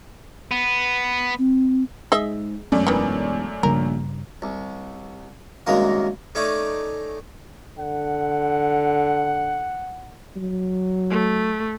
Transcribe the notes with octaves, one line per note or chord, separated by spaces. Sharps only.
B3
C4
G#2 G#4 D#5 E5
E1 F#2 A3 C#4 D5
D#3 E3
A#1 G2 C#3 G3 A#4
C2
C2 F#2 D#3 G#3 A#3 F5
A3 C#4 D#4 D5
D3 F#5
F#3
A3